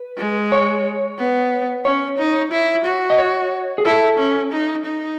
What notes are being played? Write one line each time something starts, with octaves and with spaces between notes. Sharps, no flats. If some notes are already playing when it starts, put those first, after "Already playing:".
Already playing: B4
G#3
C#5
B3
C#4 C#5
D#4
E4
F#4
D#5
C#5
G#4
E4 A4
C#4
D#4
D#4